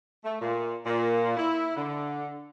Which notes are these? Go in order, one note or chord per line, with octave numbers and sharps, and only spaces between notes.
A3
A#2
A#2
E4
D3